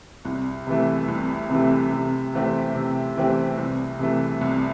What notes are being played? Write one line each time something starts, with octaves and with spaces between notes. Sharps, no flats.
C2
C3 E3 A3
C2
C3 E3 A3
C3
E3 A3 C4 G4
C3
E3 A3 C4 G4
C2
C3 E3 A3
C2